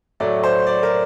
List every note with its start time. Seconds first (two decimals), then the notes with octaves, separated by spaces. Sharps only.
0.20 A2 F#3 A3 D5
0.44 C5
0.67 D5
0.83 A#4